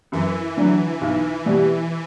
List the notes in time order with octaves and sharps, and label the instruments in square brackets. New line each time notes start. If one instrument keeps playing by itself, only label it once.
[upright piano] F#2 [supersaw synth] E3
[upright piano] D3 F#3
B1
B2 G3 B3